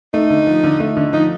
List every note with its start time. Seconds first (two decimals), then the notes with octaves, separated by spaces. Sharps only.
0.14 A3 D#4
0.30 D3
0.47 F3
0.64 D3
0.80 A3
0.97 D3
1.13 F3 D#4